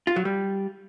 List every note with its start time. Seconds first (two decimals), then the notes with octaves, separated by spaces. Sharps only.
0.07 F4
0.16 F#3
0.25 G3